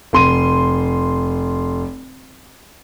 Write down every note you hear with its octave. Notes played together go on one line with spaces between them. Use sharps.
F1 C6 D#7